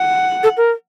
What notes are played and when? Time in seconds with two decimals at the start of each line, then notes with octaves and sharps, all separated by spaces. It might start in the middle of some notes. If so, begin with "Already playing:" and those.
Already playing: F#5
0.43 A4
0.57 A#4